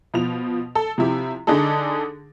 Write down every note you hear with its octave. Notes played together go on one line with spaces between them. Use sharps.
B2 F3 F7
A4
C3 F3 E4 G4
D3 D4 D#4 G#4 A4